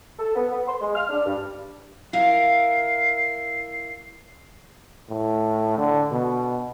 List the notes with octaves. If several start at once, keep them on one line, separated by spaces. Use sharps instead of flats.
A4
B3
B3
C6
G#3
F6
D4
G2
E4 A#4 F5 C7
A2
D3
B2